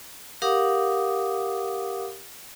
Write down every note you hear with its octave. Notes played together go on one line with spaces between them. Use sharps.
G4 A#4 F5 F#5 D6 D#6